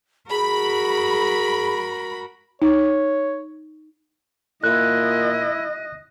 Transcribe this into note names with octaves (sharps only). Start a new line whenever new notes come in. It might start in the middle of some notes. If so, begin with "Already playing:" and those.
F#4 G#4 A#4 B5
D#4 C#5
A#2 E4 D#5 F#6